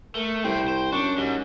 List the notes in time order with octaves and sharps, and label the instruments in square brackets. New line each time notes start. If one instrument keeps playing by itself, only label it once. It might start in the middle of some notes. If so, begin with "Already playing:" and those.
[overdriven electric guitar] A3 [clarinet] A#4
[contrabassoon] C2 [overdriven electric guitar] C3 C5 [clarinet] G5
[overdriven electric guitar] C5
[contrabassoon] F#2 [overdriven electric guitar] D4 [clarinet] C#6
[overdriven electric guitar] G#2 [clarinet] G4